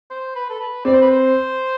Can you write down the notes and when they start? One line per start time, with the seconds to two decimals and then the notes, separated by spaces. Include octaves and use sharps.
0.10 C5
0.35 B4
0.50 A4
0.60 B4
0.85 C4 D5
0.93 C5
1.01 B4
1.10 C5